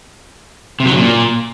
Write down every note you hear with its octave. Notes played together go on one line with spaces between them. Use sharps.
C3
F#3
C#3
A#2